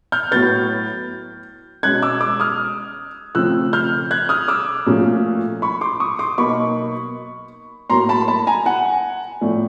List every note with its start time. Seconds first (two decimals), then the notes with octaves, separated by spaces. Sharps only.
0.12 F6 G6
0.31 A2 F#3 B3 G6 A6
1.83 B2 G#3 C#4 F#6 G#6
2.02 D6 E6
2.21 D6 E6
2.40 D#6 F6
3.35 C#3 F3 A3 C4 E6 F#6
3.73 F6 G6
4.11 F#6 G#6
4.29 D#6 F6
4.48 D6 E6
4.86 A#2 F3 A3 C#4
5.62 B5 C#6
5.81 C6 D6
6.00 C#6 D#6
6.19 C6 D6
6.38 B2 F#3 A#3 D#4 B5 C#6
7.90 A2 F#3 A#3 A#5 C6
8.09 A5 B5
8.28 A5 B5
8.47 G#5 A#5
8.66 F#5 G#5
9.41 A2 F3 A3 D4